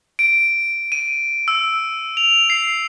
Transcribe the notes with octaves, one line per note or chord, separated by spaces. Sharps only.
D7
D#7
E6
F7
C7